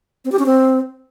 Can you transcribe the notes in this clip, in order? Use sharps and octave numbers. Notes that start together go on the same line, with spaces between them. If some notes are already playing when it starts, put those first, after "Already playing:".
C4
G4
C#4
C4